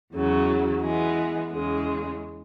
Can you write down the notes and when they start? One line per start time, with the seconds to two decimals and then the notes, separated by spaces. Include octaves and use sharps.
0.14 E2 C#3 F#3
0.83 E3 G#3 B3
1.52 E2 C#3 G#3